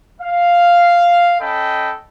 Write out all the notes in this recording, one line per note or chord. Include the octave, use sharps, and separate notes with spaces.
F5
C#4 A4 D#5 G5 B5